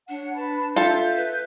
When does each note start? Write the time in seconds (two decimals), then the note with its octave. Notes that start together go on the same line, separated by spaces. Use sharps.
0.09 D4 C#5 F#5
0.34 B4 A5 B5
0.76 F4 A4 E5 G6
1.16 B4